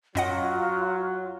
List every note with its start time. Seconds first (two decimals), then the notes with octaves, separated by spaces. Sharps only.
0.15 F#2 F#3 F4 D#5 F#5